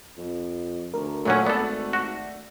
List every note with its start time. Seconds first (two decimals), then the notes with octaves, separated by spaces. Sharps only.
0.18 F2
0.94 D2 A#4
1.25 A#2 F#3 A3 C#4 F#5
1.46 G#1 B3 A4 D5
1.93 F#4